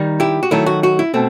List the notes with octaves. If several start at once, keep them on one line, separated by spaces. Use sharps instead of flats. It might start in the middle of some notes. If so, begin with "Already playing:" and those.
Already playing: D#3 G3 D#4
E4 G4
F#4
D#3 F#3 A3 D#4 E4
F#4
F#4
E4
B2 A3 C4